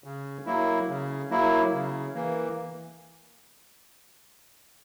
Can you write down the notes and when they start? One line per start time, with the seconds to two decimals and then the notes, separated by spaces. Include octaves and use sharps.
0.04 C#3
0.46 F#3 A#3 E4
0.88 C#3
1.30 F#3 A#3 E4
1.73 C#3
2.15 E3 A#3